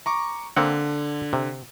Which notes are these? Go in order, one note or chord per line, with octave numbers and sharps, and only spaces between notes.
A#5 C#6 D6
D3 A#3 C4 F#5
C3